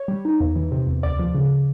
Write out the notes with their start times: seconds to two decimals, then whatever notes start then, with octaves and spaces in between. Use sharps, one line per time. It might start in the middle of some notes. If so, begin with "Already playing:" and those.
Already playing: C#5
0.08 G3
0.25 D#4
0.40 E2
0.56 E3
0.72 C3
0.87 E2
1.03 D2 D5
1.19 F3
1.35 C#3